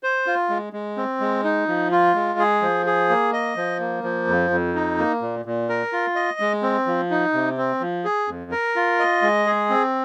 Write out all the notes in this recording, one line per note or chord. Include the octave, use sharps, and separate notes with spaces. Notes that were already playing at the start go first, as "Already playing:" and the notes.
C5
F4
G#3
G#3
C4
G#3
D#4
F3
F4
G#3
G#4
F3
G#4
A#3
D#5
F3
A#3
F3
F2
F2
D#4
A#3
A#2
A#2
A#4
F4
D#5
G#3
C4
F3
D#4
C3
C4
F3
G#4
F2
A#4
F4
D#5
G#3
G#4
C4